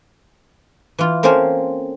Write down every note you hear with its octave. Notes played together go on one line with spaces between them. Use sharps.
E3 F4
A#3 C4 C#4 A4 C5 F5